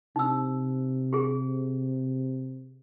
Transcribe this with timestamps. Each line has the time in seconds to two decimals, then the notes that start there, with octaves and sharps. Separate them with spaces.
0.16 C3 D#4 E6
1.13 G4 G#4